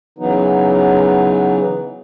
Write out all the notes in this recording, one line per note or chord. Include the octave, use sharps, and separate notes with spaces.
C#3 E3 F#3 B3 D#4